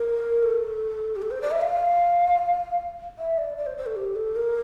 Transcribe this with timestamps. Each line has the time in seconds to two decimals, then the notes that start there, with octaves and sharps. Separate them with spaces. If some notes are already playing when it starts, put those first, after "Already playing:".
Already playing: A#4
0.43 A4
1.16 G4
1.22 A4
1.31 C5
1.42 D5
1.51 E5
1.61 F5
3.18 E5
3.38 D5
3.58 D5
3.66 C5
3.77 C5
3.86 A4
3.96 G4
4.15 A4
4.36 A#4